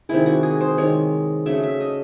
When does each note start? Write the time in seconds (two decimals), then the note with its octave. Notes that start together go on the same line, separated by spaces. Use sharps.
0.09 C3 D#3 G#3 E4
0.26 F#4
0.43 G#4
0.61 C5
0.77 C3 D#3 G#3 C#5
1.46 C#3 F#3 A3 E5
1.63 E5
1.80 D#5